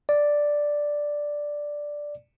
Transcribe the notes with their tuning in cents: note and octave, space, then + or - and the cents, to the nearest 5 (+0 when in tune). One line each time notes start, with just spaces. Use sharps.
D5 +0